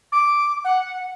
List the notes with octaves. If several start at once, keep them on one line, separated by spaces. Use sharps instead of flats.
D6
F#5